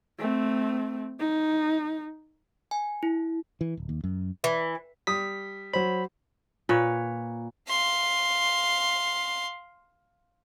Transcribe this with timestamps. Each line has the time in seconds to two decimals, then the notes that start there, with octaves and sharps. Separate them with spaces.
0.19 A3 C4
1.20 D#4
2.71 G#5
3.03 E4
3.61 E3
3.77 D1
3.89 D#2
4.04 F#2
4.44 E3
5.07 G3 D#6 B6
5.73 F#3 C5 B5
6.69 A#2 B4 C#5
7.69 F5 C6